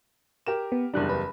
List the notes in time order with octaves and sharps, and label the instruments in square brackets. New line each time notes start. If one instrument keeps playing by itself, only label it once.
[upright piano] G4 A#4 E7
[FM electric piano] B3
[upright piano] F#1 E2 G3 [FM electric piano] D4 F#6
[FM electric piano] B4